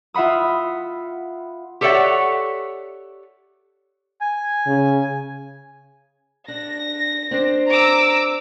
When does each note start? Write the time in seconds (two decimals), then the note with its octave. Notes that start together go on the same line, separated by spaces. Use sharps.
0.14 F4 E5 F#5 B5 D#6
1.81 G4 A4 C#5 D5 E5 F#5
4.21 G#5
4.66 C#3
6.48 D4 A#6
7.31 C4 D4 C5
7.68 A#5 D6 E6